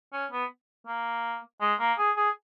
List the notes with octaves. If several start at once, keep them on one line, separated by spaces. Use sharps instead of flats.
C#4
B3
A#3
G#3
A#3
G#4
G#4